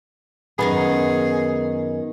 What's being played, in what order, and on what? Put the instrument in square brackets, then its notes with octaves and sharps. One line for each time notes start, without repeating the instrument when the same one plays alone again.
[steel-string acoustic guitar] F#2 D#3 D#4 [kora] B3 [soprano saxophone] G#4